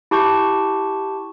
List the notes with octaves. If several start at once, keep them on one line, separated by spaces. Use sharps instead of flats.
E4 G4 A5 C#6 G6